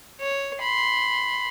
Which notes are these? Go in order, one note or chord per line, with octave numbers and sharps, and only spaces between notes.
C#5
B5 C6